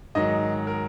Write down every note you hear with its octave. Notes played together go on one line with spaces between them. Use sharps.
G#2 D#3 F#3 D#5
A#4